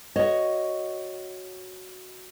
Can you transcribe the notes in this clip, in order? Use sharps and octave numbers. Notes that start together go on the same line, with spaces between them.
F#4 C#5 D#5